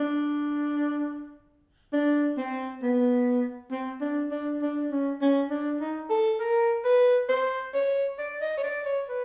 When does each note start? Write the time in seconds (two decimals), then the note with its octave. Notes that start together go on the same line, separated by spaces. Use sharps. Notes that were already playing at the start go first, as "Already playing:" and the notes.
Already playing: D4
1.93 D4
2.38 C4
2.83 B3
3.71 C4
4.01 D4
4.31 D4
4.61 D4
4.91 C#4
5.21 C#4
5.50 D4
5.81 D#4
6.10 A4
6.40 A#4
6.85 B4
7.29 C5
7.74 C#5
8.18 D5
8.41 D#5
8.58 C#5
8.63 D5
8.86 C#5
9.08 B4